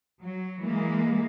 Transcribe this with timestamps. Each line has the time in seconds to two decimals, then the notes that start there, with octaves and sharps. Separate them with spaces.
0.23 F#3
0.63 E3 G#3 A#3